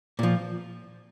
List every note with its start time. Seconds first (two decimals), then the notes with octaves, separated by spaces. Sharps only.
0.19 A#2 F3